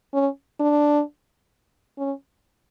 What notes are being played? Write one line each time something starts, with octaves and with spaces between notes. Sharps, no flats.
C#4
D4
C#4